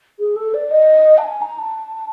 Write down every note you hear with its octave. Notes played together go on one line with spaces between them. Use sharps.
G#4
A4
D5
D#5
A5
G#5
A#5
A5